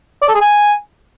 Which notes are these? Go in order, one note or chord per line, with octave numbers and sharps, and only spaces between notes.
D5
A4
G#4
G#5